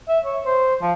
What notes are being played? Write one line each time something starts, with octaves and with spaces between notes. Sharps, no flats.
E5
C#5
C5
F3